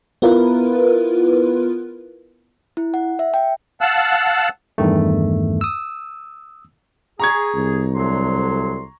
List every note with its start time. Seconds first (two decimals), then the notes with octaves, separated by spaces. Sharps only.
0.22 B3 E4 F4 A#4 B4
2.77 E4
2.94 F#5
3.19 E5
3.34 G5
3.81 F5 F#5 A5 E6 F#6
4.78 E2 G2 D#3 A3
5.61 D#6 E6
7.20 G#4 A#5 C#6 G#6
7.55 C2
7.94 D2 F#3 C6